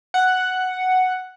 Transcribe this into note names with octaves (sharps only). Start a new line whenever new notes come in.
F#5